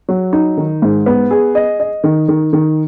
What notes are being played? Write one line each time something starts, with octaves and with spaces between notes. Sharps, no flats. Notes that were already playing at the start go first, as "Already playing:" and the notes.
F#3
D#4
D#3
G#2
B3
G#4
D#5
D#5
D#3
D#3
D#3